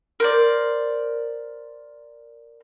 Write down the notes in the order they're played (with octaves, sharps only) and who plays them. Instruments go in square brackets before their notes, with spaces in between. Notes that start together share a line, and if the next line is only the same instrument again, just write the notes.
[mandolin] A#4 C5 D5